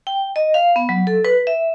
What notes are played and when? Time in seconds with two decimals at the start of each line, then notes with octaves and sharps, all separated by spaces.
0.07 G5
0.36 D#5
0.54 F5
0.76 B3
0.89 F#3
1.07 A4
1.25 B4
1.47 E5